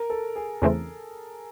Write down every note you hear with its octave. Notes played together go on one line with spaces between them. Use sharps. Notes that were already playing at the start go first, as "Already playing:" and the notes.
Already playing: A#4
A4
G#4
E2 C#3 E3 A3 C4